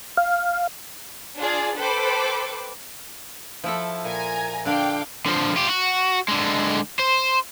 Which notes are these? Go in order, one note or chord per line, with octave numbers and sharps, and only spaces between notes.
F5
D4 F4 G#4 D5
A4 B4 C5 G5 B5 D6
F3 E4 A4
A#2 G#5 A#5
D3 D4 F5 G5 D6
D3 F3
F4 G4
F#4
D3 G#3
C5